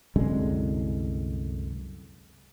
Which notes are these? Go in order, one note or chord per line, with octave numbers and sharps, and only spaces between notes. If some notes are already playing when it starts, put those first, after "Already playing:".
C2 F#2 D3 G#3